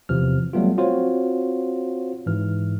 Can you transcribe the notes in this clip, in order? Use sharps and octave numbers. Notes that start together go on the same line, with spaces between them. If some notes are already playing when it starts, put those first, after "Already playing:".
E2 C3 E3 F3 F6
F#3 G3 A3 B3 F4
C4 F4 F#4 C5 C#5
G#2 E3 F6